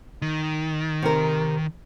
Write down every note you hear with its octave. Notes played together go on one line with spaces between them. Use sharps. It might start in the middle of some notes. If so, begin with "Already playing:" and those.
D#3
C3 A#4